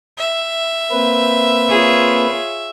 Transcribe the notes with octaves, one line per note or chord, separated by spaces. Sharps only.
E5
A#3 C4 B4
F4 G#4 C#5